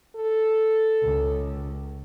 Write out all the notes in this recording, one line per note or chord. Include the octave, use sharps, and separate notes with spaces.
A4
C#2